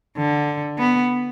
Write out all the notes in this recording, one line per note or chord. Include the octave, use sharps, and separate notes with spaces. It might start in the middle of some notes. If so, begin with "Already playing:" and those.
D3
B3